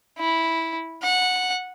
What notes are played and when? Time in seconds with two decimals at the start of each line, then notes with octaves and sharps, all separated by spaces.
0.19 E4
1.03 F#5